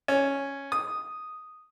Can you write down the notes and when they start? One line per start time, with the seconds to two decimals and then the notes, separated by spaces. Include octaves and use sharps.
0.08 C#4
0.72 D#6